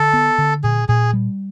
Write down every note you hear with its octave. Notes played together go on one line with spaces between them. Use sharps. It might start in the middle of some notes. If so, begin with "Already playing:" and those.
Already playing: D3 A4
B3
D3
A#2 G#4
A#2 G#4
G3